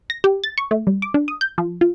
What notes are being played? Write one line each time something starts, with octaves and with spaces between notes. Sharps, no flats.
A#6
G4
A6
C#6
A3
G3
D6
D4
D#6
G6
F3
F4